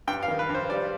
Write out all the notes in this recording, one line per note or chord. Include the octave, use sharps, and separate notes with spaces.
G2 G5
F5
D#3
B4
G2
C5
G3 D5